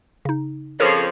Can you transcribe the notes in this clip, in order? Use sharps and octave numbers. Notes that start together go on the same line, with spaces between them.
C#3 D#4
F2 C#3 F3 A4 A#4 C#5